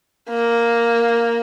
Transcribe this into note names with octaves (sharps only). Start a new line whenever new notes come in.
A#3